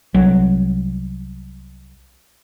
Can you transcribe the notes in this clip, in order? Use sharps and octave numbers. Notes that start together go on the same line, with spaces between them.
C2 F#3